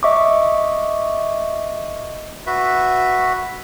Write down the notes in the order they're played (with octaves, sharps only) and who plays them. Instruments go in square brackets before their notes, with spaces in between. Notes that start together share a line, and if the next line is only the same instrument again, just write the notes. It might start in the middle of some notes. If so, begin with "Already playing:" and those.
[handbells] D#5 E5 C#6 D6
[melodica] F#4 B4 E5